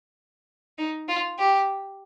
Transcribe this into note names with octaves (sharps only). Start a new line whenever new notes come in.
D#4
F4
G4